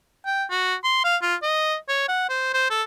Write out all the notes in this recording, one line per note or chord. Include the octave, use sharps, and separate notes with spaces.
G5
F#4
C6
F5
F4
D#5
C#5
F#5
C5
C5
A4